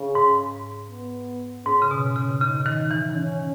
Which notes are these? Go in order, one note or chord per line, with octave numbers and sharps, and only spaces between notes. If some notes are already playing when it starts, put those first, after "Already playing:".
Already playing: C#3
G#2
B3
G#2 C#4
C#3
B2
C#3
C#3 D#4
D#3
E3
C#4